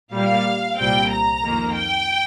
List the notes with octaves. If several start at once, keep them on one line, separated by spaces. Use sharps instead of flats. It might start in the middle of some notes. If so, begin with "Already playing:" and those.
A#2 G3 A#3 F5
C2 A#2 G3 C4 G5
A#5
F2 D#3 A#3
G5